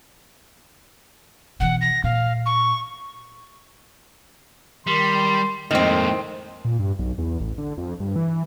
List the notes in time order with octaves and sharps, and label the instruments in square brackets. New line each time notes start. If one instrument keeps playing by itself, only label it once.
[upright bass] B2 E3 [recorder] F#5
[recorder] A#6
[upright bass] A#2 [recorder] F5
[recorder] C#6
[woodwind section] D#3 C6 [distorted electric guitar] G3
[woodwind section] F2 F3 G#3 [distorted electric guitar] A2 A#3 [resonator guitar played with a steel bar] D#3 C4
[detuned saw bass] A#2
G2
B1
E2
A1
D3
F2
G2
E3